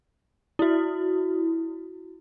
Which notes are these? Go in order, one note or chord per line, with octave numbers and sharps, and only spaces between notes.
E4 F#4